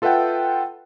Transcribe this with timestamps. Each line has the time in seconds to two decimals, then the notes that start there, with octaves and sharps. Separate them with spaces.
0.02 F4 A4 B4 E5 F#5 G5